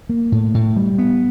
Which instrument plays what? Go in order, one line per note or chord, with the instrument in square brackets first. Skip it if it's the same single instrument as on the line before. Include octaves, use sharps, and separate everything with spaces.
[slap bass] A#3
A2
A2
G3
B3